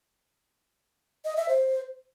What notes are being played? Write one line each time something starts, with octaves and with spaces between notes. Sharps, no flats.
D#5
E5
C5